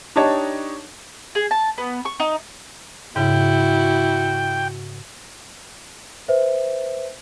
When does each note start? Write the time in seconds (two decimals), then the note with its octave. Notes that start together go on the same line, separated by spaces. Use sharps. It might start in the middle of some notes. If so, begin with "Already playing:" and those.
0.16 D4 D#4 G4 C#5 D#5 A5
1.35 G#4
1.51 A5
1.78 B3
2.05 C#6
2.20 D#4
3.16 G#2 C#3 E4 F#4 G5
6.28 B4 C5 E5